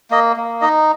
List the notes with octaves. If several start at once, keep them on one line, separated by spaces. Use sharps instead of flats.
A#3 D#5
A#3
D#4 D#5